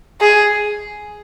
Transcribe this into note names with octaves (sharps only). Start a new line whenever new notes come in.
G#4